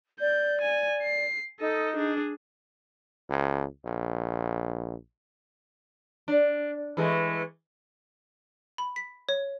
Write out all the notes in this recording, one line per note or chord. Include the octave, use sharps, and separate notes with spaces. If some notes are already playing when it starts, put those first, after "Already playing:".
D5 G6
G#5
C7
D#4 A4 D#5
D4 G#4
C#2
A#1
D4
E3 G#3 A3
B5
B6
C#5